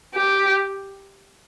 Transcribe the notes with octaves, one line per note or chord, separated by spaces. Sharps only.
G4